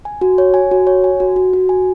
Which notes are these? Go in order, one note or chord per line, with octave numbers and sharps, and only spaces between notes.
G#5
F#4
C#5
G#5
F#4
C#5
G#5
F#4
F#4
F#4
G#5